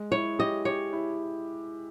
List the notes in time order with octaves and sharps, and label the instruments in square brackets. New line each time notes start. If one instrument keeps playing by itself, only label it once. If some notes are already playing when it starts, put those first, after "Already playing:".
Already playing: [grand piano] G#3
[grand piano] E4 [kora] C#5
[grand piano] G4 [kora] D#5
[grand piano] G4 [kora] C#5
[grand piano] E4